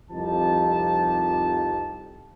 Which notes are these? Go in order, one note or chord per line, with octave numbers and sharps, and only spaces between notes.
C2 F2 F3 D#4 G4 A5